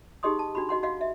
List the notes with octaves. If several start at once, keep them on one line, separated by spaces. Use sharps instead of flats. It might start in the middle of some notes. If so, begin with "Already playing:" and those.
D#4 G4 G#4 D#5 C6 D#6
A5
D4 F#4 B5
F#4 D#5 F#5 C6
F#4 D#5 F5 F#5
E5